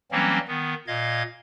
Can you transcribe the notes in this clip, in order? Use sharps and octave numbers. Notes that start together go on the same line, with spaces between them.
E3 F#3 G3 A#3 C4 C#4
D#3 B3
A#2 D#5 F5 G#6